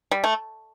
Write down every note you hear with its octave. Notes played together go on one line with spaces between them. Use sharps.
G3
A3